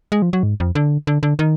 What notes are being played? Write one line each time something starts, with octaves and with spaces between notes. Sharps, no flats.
G#3
F3
F#3
G#2
F2
D3
D3
D3
D#3